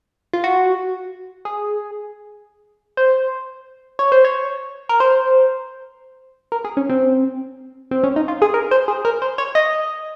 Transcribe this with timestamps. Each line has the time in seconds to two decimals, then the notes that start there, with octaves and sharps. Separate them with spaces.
0.33 F4
0.44 F#4
1.45 G#4
2.97 C5
3.99 C#5
4.12 C5
4.25 C#5
4.89 A#4
5.00 C5
6.52 A#4
6.65 G#4
6.77 C#4
6.90 C4
7.91 C4
8.04 C#4
8.16 D#4
8.28 F4
8.42 G#4
8.54 A#4
8.71 C5
8.88 G#4
9.05 A#4
9.22 C5
9.38 C#5
9.55 D#5